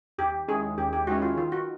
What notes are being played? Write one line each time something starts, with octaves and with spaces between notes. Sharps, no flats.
D#2 G4
D#3 G#3 C#4 E4 G#4
D#2 G4
G4
D#3 G#3 C#4 E4 F#4
F4
D#3 F4
F#4